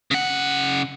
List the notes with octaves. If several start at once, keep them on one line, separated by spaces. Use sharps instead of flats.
C#3 F#5